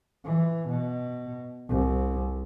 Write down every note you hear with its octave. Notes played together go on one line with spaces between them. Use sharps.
E3
B2
C2